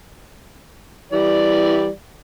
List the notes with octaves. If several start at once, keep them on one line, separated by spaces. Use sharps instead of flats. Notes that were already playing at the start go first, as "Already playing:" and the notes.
E3 G3 D5